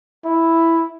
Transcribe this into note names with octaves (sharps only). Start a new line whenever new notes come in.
E4